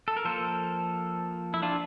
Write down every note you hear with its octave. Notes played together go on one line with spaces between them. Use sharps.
A4
A#4
F3 A#3 A4 C5
E4
D4 F4